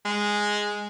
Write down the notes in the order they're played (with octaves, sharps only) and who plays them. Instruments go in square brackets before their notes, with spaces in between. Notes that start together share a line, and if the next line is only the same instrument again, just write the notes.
[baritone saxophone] G#3